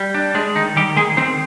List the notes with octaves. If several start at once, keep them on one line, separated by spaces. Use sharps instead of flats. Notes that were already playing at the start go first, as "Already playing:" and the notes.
Already playing: G3
D4
G#3 D4
D#3 D#4
D#3 G3 G4
D#3 G#3 G#4
D#3 C4 C5